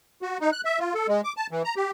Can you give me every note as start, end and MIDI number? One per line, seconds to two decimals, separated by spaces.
0.22 0.38 66
0.41 0.51 63
0.52 0.61 90
0.65 0.79 76
0.79 0.94 65
0.94 1.07 69
1.08 1.21 56
1.24 1.33 86
1.37 1.47 81
1.51 1.63 52
1.65 1.74 82
1.76 1.91 67